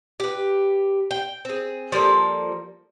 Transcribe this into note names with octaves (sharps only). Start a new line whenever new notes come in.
G4 B4
G5
C4 G#4
F3 G3 A#3 A4